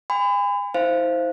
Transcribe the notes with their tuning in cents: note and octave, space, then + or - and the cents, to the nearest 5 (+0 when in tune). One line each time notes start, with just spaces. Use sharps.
G#5 -40 B5 +35
E4 -40 C5 +0 F5 -15